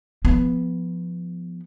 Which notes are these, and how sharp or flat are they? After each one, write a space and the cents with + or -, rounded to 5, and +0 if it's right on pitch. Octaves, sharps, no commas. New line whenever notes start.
F3 +0 B3 +0